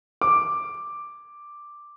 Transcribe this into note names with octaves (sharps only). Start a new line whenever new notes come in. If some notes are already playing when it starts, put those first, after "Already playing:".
D6